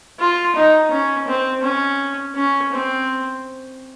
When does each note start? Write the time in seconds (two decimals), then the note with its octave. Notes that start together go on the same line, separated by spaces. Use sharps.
0.20 F4
0.56 D#4
0.91 C#4
1.27 C4
1.63 C#4
2.35 C#4
2.72 C4